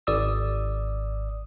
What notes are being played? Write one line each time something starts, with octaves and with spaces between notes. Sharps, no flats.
G#1 D5 D#6 E6